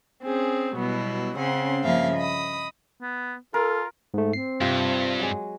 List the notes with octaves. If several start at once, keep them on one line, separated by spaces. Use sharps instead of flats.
C4 C#4 G#4
B2 F#3 G3 B3 E4
C#3 C4 C#4 F#5 C6
G2 C#3 F3 A#3 E5 F5
D#5 B5 D#6
B3
F4 A4 A#4
G#2 A3
C4 C7
G2 C3 F4
F#3 G#3